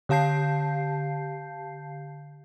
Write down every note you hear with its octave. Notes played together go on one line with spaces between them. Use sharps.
D3 G4 F5 A5 G6 C7